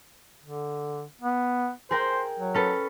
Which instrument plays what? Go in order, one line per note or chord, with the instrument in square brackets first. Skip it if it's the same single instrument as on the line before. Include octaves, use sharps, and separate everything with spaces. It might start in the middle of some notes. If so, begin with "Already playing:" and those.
[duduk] D3
B3
[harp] G#4 A#4 G5 [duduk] C5
[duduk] F#3
[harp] C#4 A4 B4